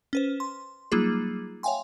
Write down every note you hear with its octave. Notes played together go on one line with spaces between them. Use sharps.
C#4 B4 C5
C6
F#3 G3 A#3 D#4 F4 G#4
C#5 E5 F5 G5 G#5 C6